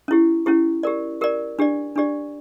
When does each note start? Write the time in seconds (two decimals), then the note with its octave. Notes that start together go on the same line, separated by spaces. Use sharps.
0.08 C#4 E4 G4
0.46 C#4 E4 G4
0.83 G4 A#4 D5
1.21 G4 A#4 D5
1.59 D4 G4 D5
1.96 D4 G4 D5